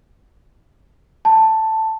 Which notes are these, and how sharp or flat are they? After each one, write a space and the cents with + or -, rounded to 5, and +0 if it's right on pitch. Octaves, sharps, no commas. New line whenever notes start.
A5 +5